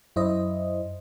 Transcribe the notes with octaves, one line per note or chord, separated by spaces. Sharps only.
F#2 E4 C5 D#5